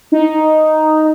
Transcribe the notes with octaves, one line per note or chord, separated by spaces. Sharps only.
D#4